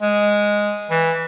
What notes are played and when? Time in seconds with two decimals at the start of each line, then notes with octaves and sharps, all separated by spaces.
0.02 G#3
0.91 E3